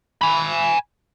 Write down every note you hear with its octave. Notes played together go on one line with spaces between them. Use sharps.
G#5 B5